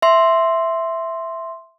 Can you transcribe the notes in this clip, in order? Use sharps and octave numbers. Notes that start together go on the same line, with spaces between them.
E5 C6